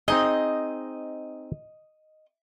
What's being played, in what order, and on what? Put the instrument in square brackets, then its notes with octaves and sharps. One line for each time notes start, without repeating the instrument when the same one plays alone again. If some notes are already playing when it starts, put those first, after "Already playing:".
[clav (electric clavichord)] C4 D#4 G#4 [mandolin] D#5